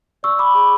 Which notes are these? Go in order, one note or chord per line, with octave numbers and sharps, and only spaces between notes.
D5 C#6 E6
B5 D6
G#4 B5 D6